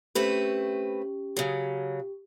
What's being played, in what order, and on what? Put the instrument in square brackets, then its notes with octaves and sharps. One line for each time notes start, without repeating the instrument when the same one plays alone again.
[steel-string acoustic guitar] A3 C4 B4 [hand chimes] C#4 G4
[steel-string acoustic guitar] C#3 F#3 [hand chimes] G4